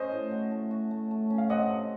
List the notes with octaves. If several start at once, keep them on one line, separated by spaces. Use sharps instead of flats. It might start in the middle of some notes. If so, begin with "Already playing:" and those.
Already playing: C#4 C5 D#5
A2
F#4
A3
F#4
A3
A3
C#4
F5
C4 D#5 F#5
C3